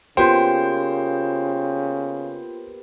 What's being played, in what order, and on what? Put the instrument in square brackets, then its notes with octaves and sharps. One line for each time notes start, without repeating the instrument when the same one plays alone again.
[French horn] C#3 [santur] A#3 B3 G4 [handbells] F4 G5 [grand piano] C5